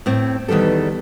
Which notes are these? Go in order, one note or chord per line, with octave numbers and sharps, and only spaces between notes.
A2 C4
E2 D#3 E3 G3 A4